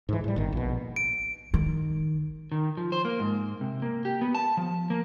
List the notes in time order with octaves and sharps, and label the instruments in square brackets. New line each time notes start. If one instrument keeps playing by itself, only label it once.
[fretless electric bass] G#2 E3
A2 G3
G1 D#3
A#1 B2
[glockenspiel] D7
[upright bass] D#3
[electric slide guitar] D#3
F3
C5
A#3
G#2
C3
A#3
G4
B3
A5
F3
A#3